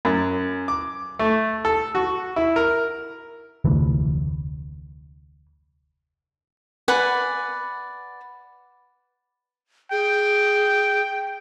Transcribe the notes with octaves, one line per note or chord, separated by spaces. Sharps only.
F#2
D6
A3
A4
F#4
E4
A#4
F1 D2 E3
B4 D5 F#5 G#5
G#4 G5